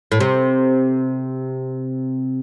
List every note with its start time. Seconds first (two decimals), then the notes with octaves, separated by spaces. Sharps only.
0.12 A2
0.20 C3